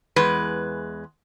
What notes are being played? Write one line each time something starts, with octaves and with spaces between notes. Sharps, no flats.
E2 G#3 B4